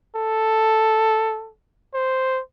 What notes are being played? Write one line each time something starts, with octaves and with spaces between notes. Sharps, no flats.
A4
C5